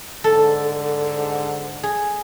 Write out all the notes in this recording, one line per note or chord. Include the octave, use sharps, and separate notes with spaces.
G#2 D3 A4
G#4